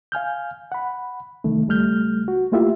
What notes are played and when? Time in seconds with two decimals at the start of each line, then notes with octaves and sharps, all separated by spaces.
0.12 F5 G#5 F6 G6
0.72 F#5 B5
1.44 C2 D#3 A3
1.68 C#2 G3 A3 F6 G6
2.28 F#4
2.52 A3 A#3 E4 F4 G4 E5